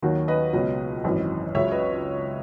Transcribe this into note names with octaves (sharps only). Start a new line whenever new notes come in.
D#2 D#3 F#3 F#4
B4 D#5
C#2 B2 F#3 B4 D#5
G#1 F#2 E3
C#2 C#3 F#3 C#5 E5
B4 D#5